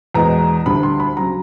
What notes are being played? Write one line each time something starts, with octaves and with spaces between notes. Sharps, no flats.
E2 B2 G#3 A#5
D2 D3 G3 B5
C6
B5
C#3 F#3 A#5